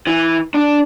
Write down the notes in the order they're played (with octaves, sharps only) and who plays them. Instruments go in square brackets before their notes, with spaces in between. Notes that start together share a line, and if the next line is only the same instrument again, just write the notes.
[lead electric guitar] E3
D4